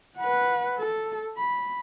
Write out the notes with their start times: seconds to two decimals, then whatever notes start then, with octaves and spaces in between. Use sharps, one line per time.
0.17 B4 F#5
0.78 A4
1.37 B5